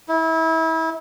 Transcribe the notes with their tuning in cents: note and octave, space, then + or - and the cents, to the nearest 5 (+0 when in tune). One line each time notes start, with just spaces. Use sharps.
E4 -30